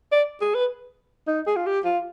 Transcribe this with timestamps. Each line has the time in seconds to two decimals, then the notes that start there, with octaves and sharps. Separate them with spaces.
0.12 D5
0.41 G#4
0.55 B4
1.27 D#4
1.47 G#4
1.56 F4
1.66 G4
1.85 F4